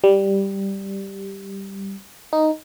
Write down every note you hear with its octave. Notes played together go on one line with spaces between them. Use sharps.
G3
D#4